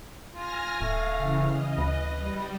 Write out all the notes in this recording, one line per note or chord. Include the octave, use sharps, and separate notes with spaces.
F4 G#5 F6 A#6
D1 A3 F5
C#3 E3
D#5
D2 B4
G3